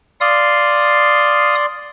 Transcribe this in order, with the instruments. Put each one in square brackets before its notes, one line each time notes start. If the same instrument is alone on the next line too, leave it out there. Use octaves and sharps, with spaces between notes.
[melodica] D5 C6 [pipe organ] F5 D#6